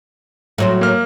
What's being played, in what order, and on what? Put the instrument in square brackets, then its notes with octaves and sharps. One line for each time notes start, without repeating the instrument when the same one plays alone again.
[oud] A2 F#3 C5
[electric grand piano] A#3 F6